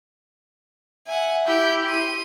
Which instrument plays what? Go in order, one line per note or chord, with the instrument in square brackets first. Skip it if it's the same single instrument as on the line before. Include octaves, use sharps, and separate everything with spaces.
[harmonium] E5 [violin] F#5 G#5
[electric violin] E4 G4 [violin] E6 G6
[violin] C6 D#7